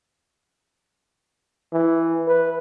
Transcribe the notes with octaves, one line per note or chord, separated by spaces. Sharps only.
E3
B4